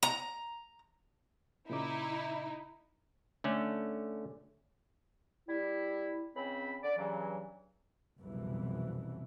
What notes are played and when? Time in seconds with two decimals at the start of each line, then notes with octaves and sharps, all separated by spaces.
0.03 A#5
1.70 A#2 C#3 D#4 E4 D6
3.44 D3 A3 C#4
5.48 G3 E4
6.35 C#2 C#3 C4 B5
6.82 D3 D5
6.97 G2 C#3 E3 F#3
8.20 F#1 C2 F2 B2 E3